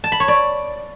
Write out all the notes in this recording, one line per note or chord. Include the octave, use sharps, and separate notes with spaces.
A5
B5
C#5
D5